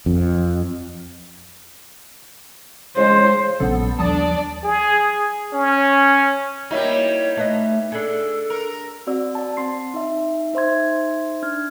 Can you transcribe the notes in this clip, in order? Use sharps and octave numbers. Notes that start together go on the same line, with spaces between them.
F2
C#3 G#3 C5
A#1 C#3 F#3 B3 A4
D#2 F3 G3 D4 D5 A5 D#6 A6
G#4
C#4
G3 A#3 D#4 E4 F#4 C#5
A3 B4 D#5
D4 G#4 A4
A#4
C4 F#4 D5 E6
D5 A5
C4 C6 C7
D#4 E5
D#4 C5 E5 C6 G#6
D4 F6 G#6